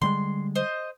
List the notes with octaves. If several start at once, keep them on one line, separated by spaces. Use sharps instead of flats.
D3 G3 G#3 C6
C5 D#5